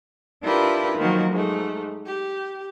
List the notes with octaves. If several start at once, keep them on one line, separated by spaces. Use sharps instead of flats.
D4 E4 F4 G4 A#4 B4
D#3 F3 F#3 A#3 F#4
G#2 A3
G4